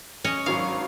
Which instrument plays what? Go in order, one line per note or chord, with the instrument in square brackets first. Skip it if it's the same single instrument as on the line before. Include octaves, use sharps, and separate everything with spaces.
[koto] C#4 C#5 D#5
[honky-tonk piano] G#1 F#3 C#6 [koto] F5